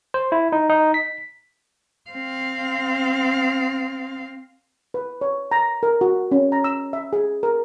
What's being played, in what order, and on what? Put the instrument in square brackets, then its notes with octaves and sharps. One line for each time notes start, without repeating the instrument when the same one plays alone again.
[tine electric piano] C5
E4
D#4
D#4
B6
[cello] C4 F5
[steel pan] B4
C#5
A#5
A#4
F#4
C#4
A#5
E6
E5
G#4
A#4